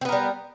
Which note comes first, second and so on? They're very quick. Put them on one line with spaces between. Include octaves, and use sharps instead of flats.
C4 B3 A#4 G3